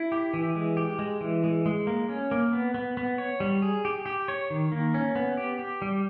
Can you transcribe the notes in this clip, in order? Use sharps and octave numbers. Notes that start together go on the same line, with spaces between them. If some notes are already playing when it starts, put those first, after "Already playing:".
Already playing: E4
G4
E3
G#3
G4
G#3
E3
G#3
G#3
A#3
C#4
A#3
B3
B3
B3
C#5
G3
G#4
G4
G4
C#5
D#3
A#3
C#4
B3
G4
G4
G3